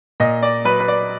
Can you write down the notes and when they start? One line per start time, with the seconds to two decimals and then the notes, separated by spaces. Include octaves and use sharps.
0.20 A#2 D#5
0.43 D5
0.65 F#3 B4
0.80 B4
0.88 D5